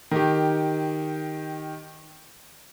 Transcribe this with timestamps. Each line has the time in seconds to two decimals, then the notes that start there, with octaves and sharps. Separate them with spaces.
0.11 D#3 G4